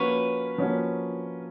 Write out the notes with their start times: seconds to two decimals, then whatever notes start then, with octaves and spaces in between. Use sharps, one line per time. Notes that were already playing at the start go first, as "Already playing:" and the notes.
Already playing: F3 A#3 C#4 F#4 B4 C#5
0.58 F3 A#3 C#4 F#4